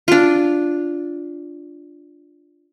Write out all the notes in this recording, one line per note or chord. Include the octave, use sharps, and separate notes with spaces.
D4 F4